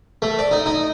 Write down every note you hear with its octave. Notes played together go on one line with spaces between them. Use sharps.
A3
D5
D#4
D#4